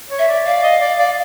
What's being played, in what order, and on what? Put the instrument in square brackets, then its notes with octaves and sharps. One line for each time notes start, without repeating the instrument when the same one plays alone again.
[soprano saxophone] C#5
[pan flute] E5
[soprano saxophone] D5
[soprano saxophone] D5 [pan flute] F5
[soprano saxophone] D#5
D5
D5